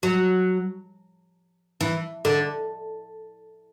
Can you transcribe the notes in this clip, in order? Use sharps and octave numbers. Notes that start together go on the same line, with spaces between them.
F#3
E3
D3